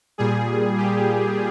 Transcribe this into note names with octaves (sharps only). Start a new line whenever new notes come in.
A#2 G3 G#4
G4